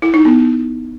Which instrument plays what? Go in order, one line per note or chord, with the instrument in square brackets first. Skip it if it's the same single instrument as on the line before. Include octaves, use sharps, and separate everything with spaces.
[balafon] E4
D#4
B3